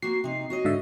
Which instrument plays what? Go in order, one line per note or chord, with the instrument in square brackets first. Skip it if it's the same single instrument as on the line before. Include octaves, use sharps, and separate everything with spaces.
[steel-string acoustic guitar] A#3 F#4 [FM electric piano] C7
[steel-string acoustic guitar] C3 D#4
F#4 C#5 D#5
[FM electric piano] G#2 D3 E5